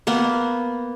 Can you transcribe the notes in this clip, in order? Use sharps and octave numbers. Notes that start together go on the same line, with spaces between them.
A#3 B3